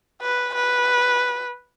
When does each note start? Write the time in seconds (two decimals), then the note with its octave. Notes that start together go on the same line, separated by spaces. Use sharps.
0.22 B4
0.55 B4